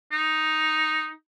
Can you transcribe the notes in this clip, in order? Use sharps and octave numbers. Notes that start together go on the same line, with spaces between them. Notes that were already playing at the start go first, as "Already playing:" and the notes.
D#4